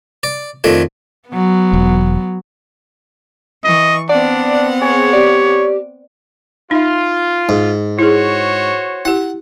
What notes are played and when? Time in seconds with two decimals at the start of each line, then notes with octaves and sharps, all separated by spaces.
0.23 D5
0.64 F2 D#3 A3 D4
1.29 F#3 B3
1.73 E1
3.64 E3 D#5 C#6
4.09 B3 C4 D4 D5 F#5
4.82 G#4 C#5
5.13 G4 D5
6.71 D#4 F4 E5
7.49 G#2
7.99 E4 F#4 G#4 C5 C#5
9.05 E4 G4 F#5